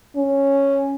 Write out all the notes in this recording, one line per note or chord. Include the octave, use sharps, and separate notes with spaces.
C#4